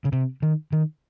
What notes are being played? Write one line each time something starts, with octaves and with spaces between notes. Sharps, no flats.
C#3
C3
D#3
D#3